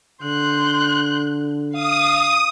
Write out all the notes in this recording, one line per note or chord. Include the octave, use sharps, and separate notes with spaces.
D3 C6 F#6 G6
F5 D#6